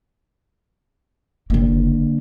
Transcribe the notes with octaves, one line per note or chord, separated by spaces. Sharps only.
F#1 D3 A#3